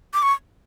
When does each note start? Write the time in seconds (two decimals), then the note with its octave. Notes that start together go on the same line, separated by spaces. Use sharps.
0.14 D6
0.23 C#6